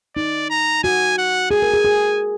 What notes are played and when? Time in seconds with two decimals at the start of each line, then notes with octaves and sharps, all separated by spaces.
0.16 D#4 D5
0.50 A#5
0.84 F#4 G#5
1.18 F#5
1.51 G#4 G#5
1.62 A#4
1.74 G#4
1.85 G#4